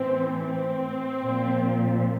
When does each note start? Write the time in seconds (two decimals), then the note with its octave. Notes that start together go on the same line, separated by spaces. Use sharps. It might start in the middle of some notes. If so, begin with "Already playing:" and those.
Already playing: A2 E3 C4
0.43 C4
1.21 A#2 F3